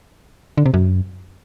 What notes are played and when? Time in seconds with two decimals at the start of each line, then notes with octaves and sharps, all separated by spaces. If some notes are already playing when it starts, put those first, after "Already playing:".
0.58 D3
0.66 C3
0.74 F#2